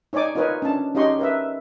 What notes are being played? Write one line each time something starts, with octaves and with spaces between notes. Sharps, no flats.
D#4 C#5 D5 G#5 D6
D#4 F4 A#4 B4 C#5 G#5
C#4 D4 A5
C#4 D#4 G4 D#5 C6 C#6
A#4 B4 E5